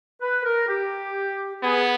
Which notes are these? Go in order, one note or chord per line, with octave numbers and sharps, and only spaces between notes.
B4
A#4
G4
B3 G#4